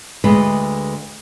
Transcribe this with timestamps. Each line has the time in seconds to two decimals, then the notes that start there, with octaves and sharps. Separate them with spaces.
0.24 D2 G#3 B4 D#5